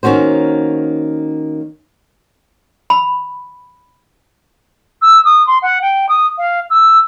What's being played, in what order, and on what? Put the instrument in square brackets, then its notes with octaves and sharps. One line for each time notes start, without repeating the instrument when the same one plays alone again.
[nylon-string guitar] D#3 A#3 C#4 F#4 C5
[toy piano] B5
[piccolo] E6
D#6
C6
F#5
G5
D#6
F5
E6